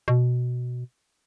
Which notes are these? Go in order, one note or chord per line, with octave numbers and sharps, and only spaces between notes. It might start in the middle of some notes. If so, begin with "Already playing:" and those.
B2